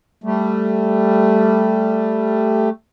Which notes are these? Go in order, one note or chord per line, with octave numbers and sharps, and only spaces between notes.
G3 A3